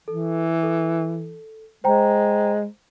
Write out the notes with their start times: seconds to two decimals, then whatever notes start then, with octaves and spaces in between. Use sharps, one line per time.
0.08 E3 A4
0.63 A4
1.84 G#3 C5 G5 A#5